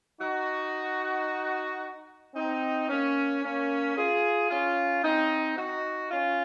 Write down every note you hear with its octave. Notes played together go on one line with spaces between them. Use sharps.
D#4 F#4
C4 D#4
A#3 C#4
A#3 C#4
F4 G#4
C#4 F4
C4 D#4
D#4 F#4
C#4 F4